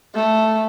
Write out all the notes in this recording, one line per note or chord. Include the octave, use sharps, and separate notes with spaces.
A3